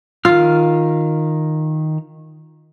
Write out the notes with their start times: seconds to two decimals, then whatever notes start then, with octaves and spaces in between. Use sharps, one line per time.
0.25 D#3 F4 F6